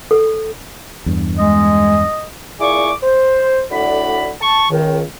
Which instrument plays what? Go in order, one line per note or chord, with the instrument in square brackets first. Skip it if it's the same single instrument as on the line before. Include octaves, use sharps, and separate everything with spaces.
[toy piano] A4
[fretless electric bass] E2 G2
[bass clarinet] G#3 [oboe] D#5
[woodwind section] A#2 E4 G#4 D5 C#6 D6
C5
A2 D3 F#4 D5 B5
A5 C#6
C#2 D#3